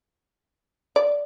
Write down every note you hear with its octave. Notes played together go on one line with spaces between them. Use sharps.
D5